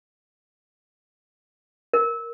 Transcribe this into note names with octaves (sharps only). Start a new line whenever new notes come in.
A#4